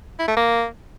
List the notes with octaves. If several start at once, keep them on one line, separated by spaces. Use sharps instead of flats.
E4
A3
A#3